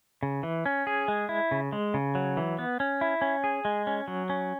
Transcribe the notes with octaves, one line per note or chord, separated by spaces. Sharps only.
C#3
E3
C#4
G#4
G#3
E4
C#3
G#3
C#3
F#3
E3
B3
C#4
E4
C#4
G#4
G#3
C#4
F#3
C#4